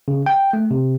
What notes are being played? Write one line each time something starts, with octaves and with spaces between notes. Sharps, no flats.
C#3
G5
A3
C3